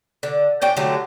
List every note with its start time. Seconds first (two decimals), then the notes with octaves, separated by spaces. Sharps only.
0.23 D3
0.62 C#4 D4 G5
0.77 D3 F#3 A3 G4